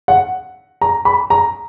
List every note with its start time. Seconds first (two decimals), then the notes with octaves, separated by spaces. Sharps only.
0.08 F#5
0.81 A#5
1.05 B5
1.30 A#5